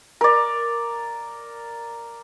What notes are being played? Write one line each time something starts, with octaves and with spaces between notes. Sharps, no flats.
A#4 D5